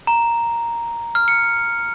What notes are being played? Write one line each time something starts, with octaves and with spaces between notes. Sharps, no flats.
A#5
F6
C#7